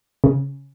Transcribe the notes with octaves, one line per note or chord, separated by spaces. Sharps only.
C#3